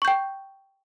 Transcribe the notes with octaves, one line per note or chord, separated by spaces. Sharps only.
G5 C#6 G6